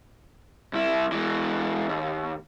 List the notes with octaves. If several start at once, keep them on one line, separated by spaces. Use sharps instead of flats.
C2 E4
E3 G#3
D#2